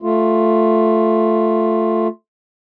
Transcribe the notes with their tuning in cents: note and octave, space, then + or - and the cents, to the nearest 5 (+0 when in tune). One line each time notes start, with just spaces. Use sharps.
A3 +0 F4 +0